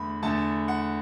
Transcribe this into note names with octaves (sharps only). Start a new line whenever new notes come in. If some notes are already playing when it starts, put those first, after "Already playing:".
Already playing: E2 D3 A3 B5
E2 D3 A3 A5
F#5